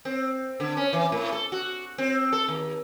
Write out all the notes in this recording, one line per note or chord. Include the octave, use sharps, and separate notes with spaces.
C4
D3
C#4
E3
A2
A4
F#4
C4
A4
D#2